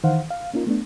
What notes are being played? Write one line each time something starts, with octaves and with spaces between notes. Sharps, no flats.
D#3 E3 C5 F5 F#5
F5
A#3 C#4 D#4 F4 A#4
A3 B3 D4